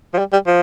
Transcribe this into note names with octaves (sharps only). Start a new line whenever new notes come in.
F3
G3
G3
F3